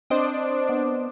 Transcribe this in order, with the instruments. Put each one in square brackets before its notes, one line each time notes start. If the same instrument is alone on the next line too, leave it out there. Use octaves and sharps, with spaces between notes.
[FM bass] C4 [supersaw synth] D4 [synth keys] C5 D#5 D6
[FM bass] B3